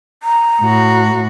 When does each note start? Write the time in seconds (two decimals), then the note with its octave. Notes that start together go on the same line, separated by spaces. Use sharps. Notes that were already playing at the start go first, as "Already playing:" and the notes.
0.23 A#5
0.61 A2 F#4